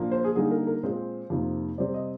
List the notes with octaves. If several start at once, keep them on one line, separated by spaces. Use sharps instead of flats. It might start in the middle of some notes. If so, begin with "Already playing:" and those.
Already playing: A#2 F3 A#3 D4
C5
G#4
D3 G3 A#3 D#4 G#4
A#4
A#4
A#2 G#3 C4 C5
F2 C3 D#3 A#3
C3 G3 C4 D5
D#5